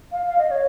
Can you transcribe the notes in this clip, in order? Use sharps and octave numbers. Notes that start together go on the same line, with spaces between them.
F5
F5
D#5
C#5